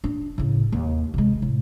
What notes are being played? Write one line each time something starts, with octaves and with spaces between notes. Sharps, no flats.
D4
A2 C#3
D#2
C3 G#3
A2